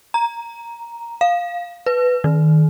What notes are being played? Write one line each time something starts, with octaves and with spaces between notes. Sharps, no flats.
A#5
F5
B4
D#3